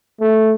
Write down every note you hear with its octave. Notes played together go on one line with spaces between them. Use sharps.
A3